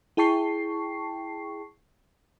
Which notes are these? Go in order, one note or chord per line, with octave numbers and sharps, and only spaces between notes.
E4 G#4 G5 A5 C#6 C7